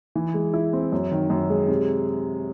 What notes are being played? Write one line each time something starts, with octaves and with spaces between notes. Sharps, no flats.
E3
G#3
E4
C4
F#2
D#3
F#2
G#3
C3